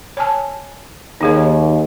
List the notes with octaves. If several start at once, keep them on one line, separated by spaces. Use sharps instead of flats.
C#5 G#5 A5
D#2 D#4 G#4 C#5